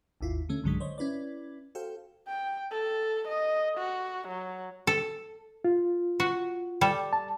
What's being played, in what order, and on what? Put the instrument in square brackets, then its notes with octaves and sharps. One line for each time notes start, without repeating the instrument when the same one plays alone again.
[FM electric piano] G#1 D#2 E4 F4
D3 A3 C#4
B1 G2 D3 F#3 G#3 B6
C5 C#5 D#5
C#4 E4 B4 D5
F#4 A4 C5 F5 G5
[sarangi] G5
A4
D#5
F#4
F#3
[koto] A4
[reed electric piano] F4
[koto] F#4
G3 A4
[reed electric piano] A5